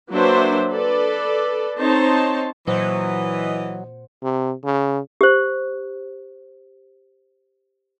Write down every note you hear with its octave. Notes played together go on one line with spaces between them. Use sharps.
F#3 A#3 D4 B4 C5 E5
A4 B4 D5
C4 D#4 C5 C#5 A5
A#2 E3 F#3 C5 D#5 F#5
C3
C#3
G4 C5